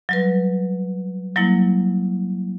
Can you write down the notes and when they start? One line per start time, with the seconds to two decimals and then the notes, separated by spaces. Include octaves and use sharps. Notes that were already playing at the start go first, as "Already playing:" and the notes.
0.09 F#3 G3 B4
1.36 F#3 G3 A#3 E4